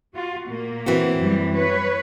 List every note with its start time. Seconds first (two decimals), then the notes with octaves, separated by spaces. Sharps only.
0.14 F4 F#4
0.47 A#2 A#3
0.86 E3 C4 F#4
1.18 F#2 F#3 G3
1.55 B4 C#5